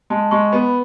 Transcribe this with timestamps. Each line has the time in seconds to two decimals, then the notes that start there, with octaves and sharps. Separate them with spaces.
0.10 G#3 A5
0.31 G#3 C#6
0.52 B3 B5